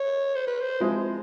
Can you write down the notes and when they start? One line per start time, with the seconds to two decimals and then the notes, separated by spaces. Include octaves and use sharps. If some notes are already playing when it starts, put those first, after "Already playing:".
Already playing: C#5
0.35 C5
0.47 B4
0.61 C5
0.80 F3 G#3 C4 E4 G#4